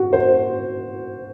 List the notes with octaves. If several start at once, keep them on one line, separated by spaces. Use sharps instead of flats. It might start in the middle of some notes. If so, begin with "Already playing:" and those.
Already playing: F#4
C5